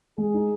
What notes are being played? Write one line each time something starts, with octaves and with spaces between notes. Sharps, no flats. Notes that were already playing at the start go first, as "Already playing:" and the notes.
G#3 G#4
D#4